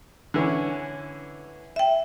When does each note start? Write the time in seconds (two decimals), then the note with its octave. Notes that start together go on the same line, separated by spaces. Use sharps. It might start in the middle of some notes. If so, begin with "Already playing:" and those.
0.34 D3 E3 C#4
1.76 E5 G5